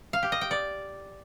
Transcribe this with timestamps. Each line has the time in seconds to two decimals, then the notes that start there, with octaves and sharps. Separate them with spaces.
0.13 F5
0.23 G4
0.32 D#5
0.41 G5
0.51 D5